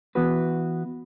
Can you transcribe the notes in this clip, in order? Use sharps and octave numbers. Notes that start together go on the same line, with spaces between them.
E3 B3 F#4 B4